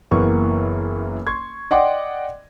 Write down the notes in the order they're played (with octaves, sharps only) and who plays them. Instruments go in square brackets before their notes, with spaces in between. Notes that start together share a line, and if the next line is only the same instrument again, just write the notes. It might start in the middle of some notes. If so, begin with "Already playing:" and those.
[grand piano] F#1 E3 A#3 B3 C#6
C6 C#6 G#6
D5 D#5 F#5 G5 C6 D6